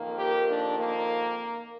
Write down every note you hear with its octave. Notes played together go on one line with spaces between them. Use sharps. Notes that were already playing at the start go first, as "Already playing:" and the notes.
Already playing: F2 D#3 A#3
G4 A#4
A#3 D4
A#3